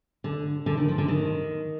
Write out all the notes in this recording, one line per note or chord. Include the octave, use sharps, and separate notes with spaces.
D3
D3
D#3
F3
D3
D#3